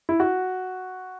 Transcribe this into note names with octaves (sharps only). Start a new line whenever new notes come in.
E4
F#4